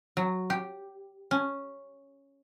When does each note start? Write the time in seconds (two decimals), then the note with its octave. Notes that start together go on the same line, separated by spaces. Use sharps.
0.17 F#3
0.50 G4
1.31 C#4